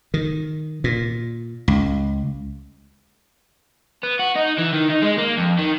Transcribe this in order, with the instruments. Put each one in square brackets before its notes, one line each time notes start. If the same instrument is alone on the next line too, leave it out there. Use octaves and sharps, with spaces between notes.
[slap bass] D#3
A#2
C#2
[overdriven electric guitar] B3
F#4
D#4
E3
D#3
D#4
G#3
A#3
F2
D#3